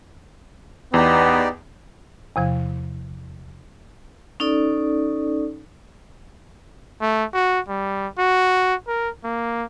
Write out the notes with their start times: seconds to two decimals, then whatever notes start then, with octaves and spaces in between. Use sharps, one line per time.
0.94 E2 B3 D#4 G4 D5
2.36 E2 C3 F3
4.40 C#4 D#4 A4 D5
7.01 A3
7.33 F#4
7.69 G3
8.19 F#4
8.88 A#4
9.24 A#3